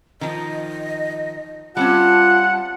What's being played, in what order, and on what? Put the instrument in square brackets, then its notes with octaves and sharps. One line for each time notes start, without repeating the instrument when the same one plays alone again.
[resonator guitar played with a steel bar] D#3 F3 [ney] D#5
[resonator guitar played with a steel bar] G3 C4 C#4 [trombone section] F4 [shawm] F#5 [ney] A5